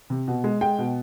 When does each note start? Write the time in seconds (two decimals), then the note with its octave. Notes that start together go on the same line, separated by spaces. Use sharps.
0.10 C3
0.27 B2
0.44 G#3
0.61 G#3 G5
0.78 B2